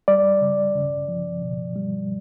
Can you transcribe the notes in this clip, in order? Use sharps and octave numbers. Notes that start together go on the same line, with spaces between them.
G3 D5
C#3
C#3
F3
B2
G3